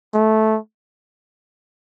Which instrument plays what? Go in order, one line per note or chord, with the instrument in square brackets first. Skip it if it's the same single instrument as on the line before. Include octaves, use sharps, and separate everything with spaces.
[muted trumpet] A3